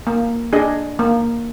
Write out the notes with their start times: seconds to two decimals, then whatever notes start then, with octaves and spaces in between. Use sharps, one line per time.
0.07 A#3
0.53 D4 G#4 D#5
0.99 A#3